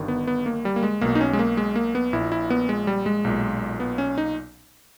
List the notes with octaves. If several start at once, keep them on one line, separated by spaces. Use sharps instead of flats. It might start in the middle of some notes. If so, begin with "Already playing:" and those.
Already playing: G1 G2 D#3
B3
B3
A#3
G3
A#3
G#3
B1 B2 A#3
D#4
C#4
G#3
A#3
G#3
A#3
B3
A#1 A#2 E4
E4
B3
G#3
G3
G#3
B1 A#2
B3
C#4
D#4